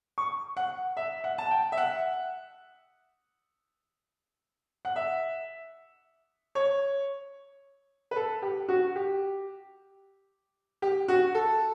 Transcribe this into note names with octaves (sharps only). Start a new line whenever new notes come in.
C#6
F#5
E5
F#5
A5
G5
E5
F#5
F#5
E5
C#5
B4
A4
G4
F#4
G4
G4
F#4
A4